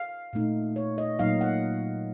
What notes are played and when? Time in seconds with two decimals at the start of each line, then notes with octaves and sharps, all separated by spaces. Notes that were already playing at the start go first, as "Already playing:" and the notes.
Already playing: F5
0.33 A#2 A3 D#4
0.76 C#5
0.98 D#5
1.19 A#2 F#3 A#3 D#4 F5
1.41 F#5